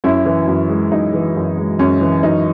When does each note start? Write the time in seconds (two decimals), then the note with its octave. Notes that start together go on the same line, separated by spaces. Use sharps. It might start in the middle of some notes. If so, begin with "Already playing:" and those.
0.04 F#2 C#4 E4
0.26 E3
0.48 F#2
0.69 G#3
0.91 F#2 D#4
1.14 E3
1.36 F#2
1.57 G#3
1.79 F#2 C#4
2.01 E3
2.23 F#2 D#4